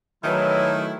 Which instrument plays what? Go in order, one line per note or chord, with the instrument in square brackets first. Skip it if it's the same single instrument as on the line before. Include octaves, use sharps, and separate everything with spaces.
[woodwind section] B2 E3 F#3 [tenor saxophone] D#3 [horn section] A3 E4